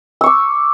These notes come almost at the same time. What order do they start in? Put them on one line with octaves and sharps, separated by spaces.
E6 C#6 D6